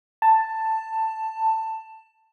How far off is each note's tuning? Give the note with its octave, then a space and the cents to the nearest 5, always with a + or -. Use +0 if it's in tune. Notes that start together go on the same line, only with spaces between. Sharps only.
A5 +10